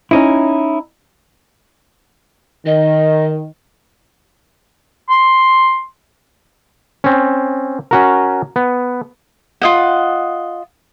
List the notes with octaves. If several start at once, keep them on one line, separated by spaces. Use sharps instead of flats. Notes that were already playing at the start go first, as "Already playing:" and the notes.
C#4 D#4 E4
D#3 D#5
C6
C4 C#4
C#4 F#4 A#4
B3
F4 D#5 F#5